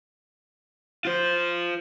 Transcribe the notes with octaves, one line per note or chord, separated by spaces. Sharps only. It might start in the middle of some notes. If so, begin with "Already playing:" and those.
F4 C5